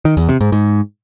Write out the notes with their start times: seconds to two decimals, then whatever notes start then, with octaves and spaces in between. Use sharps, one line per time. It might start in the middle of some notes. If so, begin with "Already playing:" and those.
0.05 D#3
0.17 E2
0.29 C3
0.41 G#2
0.52 G#2